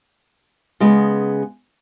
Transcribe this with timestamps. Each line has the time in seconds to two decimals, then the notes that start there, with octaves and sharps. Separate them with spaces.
0.80 C#3 G#3 B3